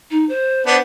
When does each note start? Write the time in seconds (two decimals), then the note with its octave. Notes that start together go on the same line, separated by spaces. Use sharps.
0.10 D#4
0.29 C5
0.66 B3 D4